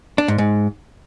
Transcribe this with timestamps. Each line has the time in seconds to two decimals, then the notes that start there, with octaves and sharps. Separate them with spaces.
0.18 D4
0.28 G#2
0.38 G#2